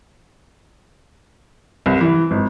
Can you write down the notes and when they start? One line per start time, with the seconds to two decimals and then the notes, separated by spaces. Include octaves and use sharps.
1.86 C2
2.01 E3
2.31 G#1